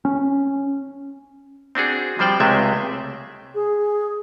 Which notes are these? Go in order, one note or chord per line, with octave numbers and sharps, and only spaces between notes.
C#4
C4 D4 F#4 G#4
F3 G3 C5 D5 G5
C#2 C3 G#3 A3 E5
G#4